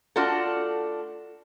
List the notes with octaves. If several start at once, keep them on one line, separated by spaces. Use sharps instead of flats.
A3 D4 F4 F#4 A4